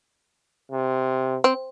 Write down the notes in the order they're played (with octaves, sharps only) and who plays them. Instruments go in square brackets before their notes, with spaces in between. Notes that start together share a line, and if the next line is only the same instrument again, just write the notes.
[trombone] C3
[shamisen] C4